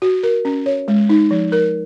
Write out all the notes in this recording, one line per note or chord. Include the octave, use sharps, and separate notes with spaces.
F#4
A#4
C#4
C#5
G#3
D#4
F3
A#4